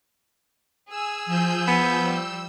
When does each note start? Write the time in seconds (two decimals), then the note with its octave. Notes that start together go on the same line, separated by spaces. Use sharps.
0.89 G#4 G#5 E6
1.26 F3 E6 G6
1.68 B3
2.04 G3 E6